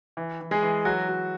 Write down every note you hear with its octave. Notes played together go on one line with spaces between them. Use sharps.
E3
E3
G#3 G#4
E3
F#3 F#4
F#3